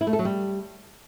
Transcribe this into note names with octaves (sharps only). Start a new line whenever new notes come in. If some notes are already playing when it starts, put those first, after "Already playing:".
E4
A3
A4
F#3
G3